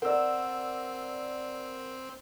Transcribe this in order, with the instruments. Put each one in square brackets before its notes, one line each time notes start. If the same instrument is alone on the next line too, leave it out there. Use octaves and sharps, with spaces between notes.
[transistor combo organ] C4 [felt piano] A#4 D5 [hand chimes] F#5 E6